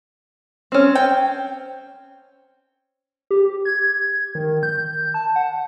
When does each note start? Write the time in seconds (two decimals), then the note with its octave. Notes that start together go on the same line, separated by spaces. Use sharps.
0.72 C4 C#4
0.95 G5
3.31 G4
3.65 G#6
4.35 D#3
4.63 G6
5.14 A5
5.36 F#5